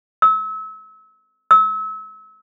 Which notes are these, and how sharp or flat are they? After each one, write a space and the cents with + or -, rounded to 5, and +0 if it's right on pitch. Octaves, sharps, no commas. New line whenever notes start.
E6 -30
E6 -30